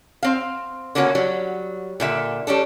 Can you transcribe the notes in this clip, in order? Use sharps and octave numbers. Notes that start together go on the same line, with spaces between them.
C4 F5
D3 A#3 B3 C#4 F#4
F#3 G3
A#2 D3 E5
G3 C#4 D4 A4